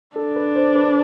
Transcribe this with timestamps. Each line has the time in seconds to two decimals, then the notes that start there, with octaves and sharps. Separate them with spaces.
0.16 D4 A4
0.36 B4
0.56 C5
0.76 B4